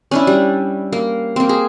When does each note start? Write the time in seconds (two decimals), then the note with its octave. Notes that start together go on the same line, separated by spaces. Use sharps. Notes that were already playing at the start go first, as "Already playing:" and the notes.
0.11 C#4 D4 E4
0.27 G3
0.92 A#3
1.36 A#3 C4
1.49 G#4